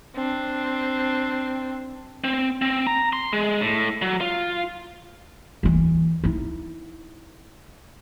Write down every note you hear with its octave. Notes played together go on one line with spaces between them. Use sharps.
C4 D4
C4
C4
A#5
C6
G#3
A2
F#3
F4
D#2 E3
D#4 E4